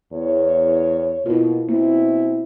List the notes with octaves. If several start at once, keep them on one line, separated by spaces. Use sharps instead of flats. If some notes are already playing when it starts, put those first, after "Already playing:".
E2 C#5
B2 A#3 E4 F4
B2 A#3 C4 E4